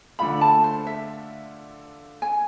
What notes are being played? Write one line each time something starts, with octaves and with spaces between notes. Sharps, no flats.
D3 A3 D4 F4 B5
A5
C5
E5
G#5